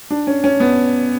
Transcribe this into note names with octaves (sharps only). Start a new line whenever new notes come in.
D4
C#4
C#4
B3